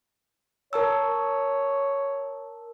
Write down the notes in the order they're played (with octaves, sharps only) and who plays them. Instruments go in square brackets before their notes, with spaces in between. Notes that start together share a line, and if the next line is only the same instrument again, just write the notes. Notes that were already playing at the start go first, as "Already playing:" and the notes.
[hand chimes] A#4 A5 E6 [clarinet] C#5